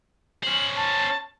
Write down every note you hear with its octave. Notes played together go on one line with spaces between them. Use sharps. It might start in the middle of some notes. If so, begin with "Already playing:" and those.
C#4 C5 F#7
A5